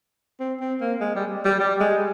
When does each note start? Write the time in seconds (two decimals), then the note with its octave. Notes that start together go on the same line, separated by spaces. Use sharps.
0.40 C4
0.60 C4
0.81 A#3
1.01 G#3
1.15 G3
1.45 G3
1.60 G3
1.80 G#3